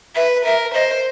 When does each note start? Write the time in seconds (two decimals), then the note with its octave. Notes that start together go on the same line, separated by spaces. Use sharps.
0.15 B4 E5
0.45 A#4 E5
0.74 C5 D#5